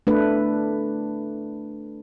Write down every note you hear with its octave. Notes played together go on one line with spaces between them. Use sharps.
A3 D4 B4